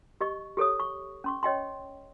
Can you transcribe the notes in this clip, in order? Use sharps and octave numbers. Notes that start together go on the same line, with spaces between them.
G4 D#5 C#6
G4 A4 C#5 D#6
C#6
C#4 C6 C#6
C#5 D#5 G5 C6